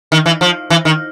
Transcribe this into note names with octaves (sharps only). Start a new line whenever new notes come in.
D#3
E3
F3
E3
D#3